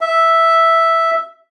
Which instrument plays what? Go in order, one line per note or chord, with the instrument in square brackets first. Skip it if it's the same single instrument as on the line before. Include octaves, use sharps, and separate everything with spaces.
[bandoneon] E5